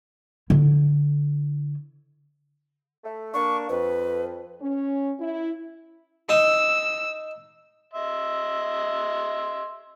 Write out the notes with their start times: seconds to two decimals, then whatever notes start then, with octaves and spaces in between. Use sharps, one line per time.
0.50 D3 E4
3.04 A3
3.34 A#3 D4 C#6
3.69 F2 B4
4.61 C#4
5.20 E4
6.29 D#4 E6
7.93 D#5 E5 C6